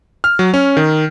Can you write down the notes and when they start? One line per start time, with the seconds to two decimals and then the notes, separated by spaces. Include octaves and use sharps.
0.24 F6
0.39 F#3
0.54 C#4
0.77 D#3